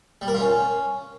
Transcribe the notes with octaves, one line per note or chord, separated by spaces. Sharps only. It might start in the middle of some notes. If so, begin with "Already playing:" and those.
G3
A#4
F4
C#4